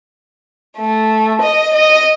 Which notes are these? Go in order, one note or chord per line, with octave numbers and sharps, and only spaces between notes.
A3
D#5
D#5